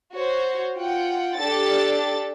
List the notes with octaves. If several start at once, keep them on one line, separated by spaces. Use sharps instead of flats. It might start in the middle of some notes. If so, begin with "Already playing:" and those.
F#4 C5 C#5
F4 F#5 G5
D4 G4 A4 A6